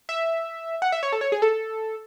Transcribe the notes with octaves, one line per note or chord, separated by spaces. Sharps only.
E5
F#5
E5
C#5
A4
C#5
G#4
A4